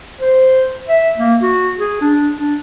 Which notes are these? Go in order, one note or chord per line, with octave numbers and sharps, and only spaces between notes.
C5
E5
A#3
F#4
G#4
D4
D4